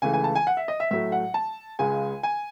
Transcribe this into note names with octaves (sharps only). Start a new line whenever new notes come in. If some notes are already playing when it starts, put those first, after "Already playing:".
C#2 C#3 E3 A3 G#5
G#5
A5
G#5
F#5
E5
D#5
E5
A2 F#3 A3 E5
F#5
A5
C#2 C#3 G#3 G#5
G#5